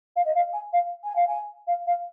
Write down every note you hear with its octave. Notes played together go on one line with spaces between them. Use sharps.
F5
D#5
F5
G#5
F5
G#5
F5
G#5
F5
F5